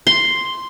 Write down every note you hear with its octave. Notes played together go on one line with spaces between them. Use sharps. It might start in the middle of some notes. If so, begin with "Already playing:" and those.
C6